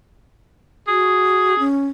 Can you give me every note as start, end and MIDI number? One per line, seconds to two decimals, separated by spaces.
0.88 1.57 66
0.88 1.63 68
1.59 1.86 61